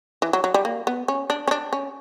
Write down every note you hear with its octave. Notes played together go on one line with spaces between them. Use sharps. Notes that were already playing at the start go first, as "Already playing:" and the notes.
E3
F#3
F#3
G3
A#3
B3
C#4
D4
C#4
D4
C#4